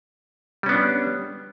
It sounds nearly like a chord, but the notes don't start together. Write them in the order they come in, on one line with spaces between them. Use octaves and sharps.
G3 C#4 B3 D4